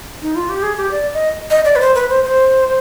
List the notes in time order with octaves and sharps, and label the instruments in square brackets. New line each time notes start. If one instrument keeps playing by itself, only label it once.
[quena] D#4
F4
G4
G#4
G4
D5
D#5
D#5
D5
B4
C5
B4
C5
C5